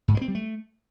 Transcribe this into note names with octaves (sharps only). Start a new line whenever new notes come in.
G#2
G#3
C4
G3
A3